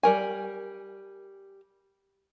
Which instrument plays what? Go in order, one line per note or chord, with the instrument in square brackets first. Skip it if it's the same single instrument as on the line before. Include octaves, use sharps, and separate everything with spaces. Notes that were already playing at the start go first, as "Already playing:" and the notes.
[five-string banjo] G3 A#4 G#5